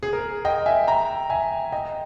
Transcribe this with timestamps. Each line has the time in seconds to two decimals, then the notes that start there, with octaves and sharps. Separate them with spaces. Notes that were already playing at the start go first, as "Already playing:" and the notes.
0.03 G#4
0.13 A#4
0.45 D#5 G5
0.66 E5 G#5
0.87 G5 A#5
1.30 E5 G#5
1.72 D#5 G5